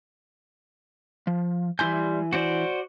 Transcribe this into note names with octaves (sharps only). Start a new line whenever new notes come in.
F3
E3 G3 E4 G#5 C6 G6
F#4 C5 D5